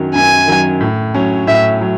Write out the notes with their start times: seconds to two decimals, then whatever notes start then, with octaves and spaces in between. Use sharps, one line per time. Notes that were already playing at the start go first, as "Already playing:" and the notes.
Already playing: F#2 D#3 F#3
0.15 F#2 G#5
0.48 D#3 F#3
0.81 A2
1.14 F#3 C#4
1.47 A2 E5
1.81 F#3